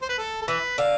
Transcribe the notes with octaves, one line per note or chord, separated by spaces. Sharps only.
C5
B4
A4
A4
E3 B4
D3 F5